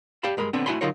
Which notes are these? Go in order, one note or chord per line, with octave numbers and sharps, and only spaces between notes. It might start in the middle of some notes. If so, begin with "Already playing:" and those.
G4 D5 F5 A5 B5
G2 G#3 A#4 B5
D3 B3 C4 D4
A3 E4 F#4 G#5 B5 C6
D3 F#3 D#4 F4 A#4 C#5